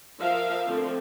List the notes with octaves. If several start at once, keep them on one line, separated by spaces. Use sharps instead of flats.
F3 A#4 E5 F5
D3 F3 A3 C4